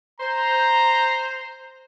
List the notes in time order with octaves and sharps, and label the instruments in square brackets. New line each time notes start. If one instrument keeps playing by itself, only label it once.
[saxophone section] C5 [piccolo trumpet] A#5